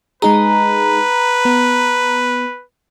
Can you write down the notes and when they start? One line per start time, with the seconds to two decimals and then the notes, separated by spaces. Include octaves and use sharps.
0.22 G#3 D#4 G#4 B4 A#5
1.45 B3